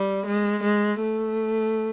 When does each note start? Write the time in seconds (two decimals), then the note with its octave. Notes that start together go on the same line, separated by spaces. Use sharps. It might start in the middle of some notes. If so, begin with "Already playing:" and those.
Already playing: G3
0.26 G#3
0.63 G#3
1.01 A3